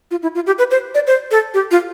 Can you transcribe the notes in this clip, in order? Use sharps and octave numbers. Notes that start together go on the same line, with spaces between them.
F4
E4
F4
G4
B4
C5
D5
C5
A4
G4
F4